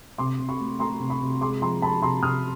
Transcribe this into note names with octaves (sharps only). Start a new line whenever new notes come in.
C3 C6 D6
C3
B5 C#6
A3
A3 A#5 C6
C3
B5 C#6
C3
G#3 C6 D6
F3 A#5 C6
F3 A5 B5
C3 A#5 C6
C3 D#6 F6